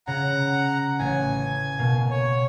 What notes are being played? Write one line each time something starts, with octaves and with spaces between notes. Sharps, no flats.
C#3 F#5 A#5
A1 G#5
B2 A#3
C#5